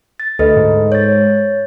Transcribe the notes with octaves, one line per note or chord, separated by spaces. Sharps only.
A6
D2 A4 B4 D#5
G#2
C#5 A6